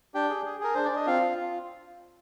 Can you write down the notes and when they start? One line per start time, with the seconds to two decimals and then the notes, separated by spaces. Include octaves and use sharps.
0.14 D4 G4 G5
0.29 G#4
0.45 G#4
0.60 G#4 A#4
0.74 D4 C5
0.85 D5
0.91 D4 D#5
1.07 C4 F4 F5
1.22 F4